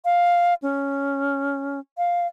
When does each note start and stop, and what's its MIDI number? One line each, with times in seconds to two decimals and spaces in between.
0.05 0.54 77
0.62 1.80 61
1.98 2.27 77